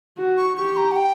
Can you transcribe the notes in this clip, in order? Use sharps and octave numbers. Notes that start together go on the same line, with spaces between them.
F#4
C#6
G4 C#6
A#5
F#5
G5